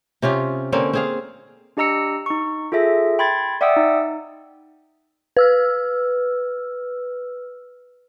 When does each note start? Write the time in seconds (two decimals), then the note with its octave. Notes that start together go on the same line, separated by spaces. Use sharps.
0.22 C3 C#4 F4 G4
0.72 D3 A#3 C4 C#4
0.93 C4 G#4 F5
1.77 D4 G4 D#5 A#5 E6 C#7
2.26 D#4 C#6
2.72 F4 G#4 A4 E5 A#6
3.19 G5 B5 C6 G#6 A6
3.61 D5 E5 F#5 G5 D#6 E6
3.77 D#4
5.37 B4 E6 F6